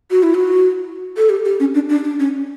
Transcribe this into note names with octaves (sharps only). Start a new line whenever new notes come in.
F#4
E4
F#4
A4
G4
G4
C#4
D4
D4
D4
C#4